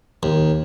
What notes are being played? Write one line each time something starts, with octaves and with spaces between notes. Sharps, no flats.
D#2